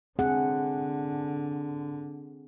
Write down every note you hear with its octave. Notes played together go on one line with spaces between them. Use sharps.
D3 C4 G#4 F#5